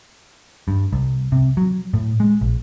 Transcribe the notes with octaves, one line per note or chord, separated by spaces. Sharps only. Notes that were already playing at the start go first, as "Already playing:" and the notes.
G2
C2
C3
F#3
A2
G#3
A#1